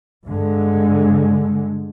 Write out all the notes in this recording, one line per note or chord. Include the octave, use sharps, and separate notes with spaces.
G2 D3 G#3